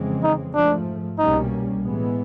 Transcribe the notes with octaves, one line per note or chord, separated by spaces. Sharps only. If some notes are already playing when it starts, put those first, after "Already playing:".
Already playing: F2 C#3 E3 G#3 C4
D#4
G#2 F3 A3 D4
C2 B2 G3 A#3 C#4 D#4
A2 E3 G#3 B3